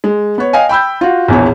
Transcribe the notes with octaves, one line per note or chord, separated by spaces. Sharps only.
G#3
B3 C#5
D#5 F5 G5 G#5
G5 B5 E6 G6
F4 F#4
A#1 E2 B2 C#5